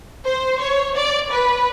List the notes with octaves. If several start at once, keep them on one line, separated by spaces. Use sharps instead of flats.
C5
C#5
D5
B4